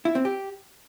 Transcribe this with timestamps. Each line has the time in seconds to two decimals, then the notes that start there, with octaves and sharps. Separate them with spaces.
0.05 E4
0.15 C4
0.25 G4